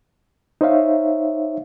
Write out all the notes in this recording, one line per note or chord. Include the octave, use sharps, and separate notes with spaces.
D#4 C5 C#5 E5 F5